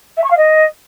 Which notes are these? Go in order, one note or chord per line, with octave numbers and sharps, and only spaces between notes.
E5
C#6
F5
D#5